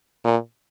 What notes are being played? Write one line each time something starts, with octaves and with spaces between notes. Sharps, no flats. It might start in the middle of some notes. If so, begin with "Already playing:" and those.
A#2